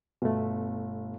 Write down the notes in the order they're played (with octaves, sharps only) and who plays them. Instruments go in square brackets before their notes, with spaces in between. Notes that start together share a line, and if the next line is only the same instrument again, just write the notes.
[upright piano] G1 [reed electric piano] B2 A3